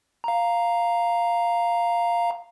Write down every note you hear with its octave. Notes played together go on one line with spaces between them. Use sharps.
F5 A#5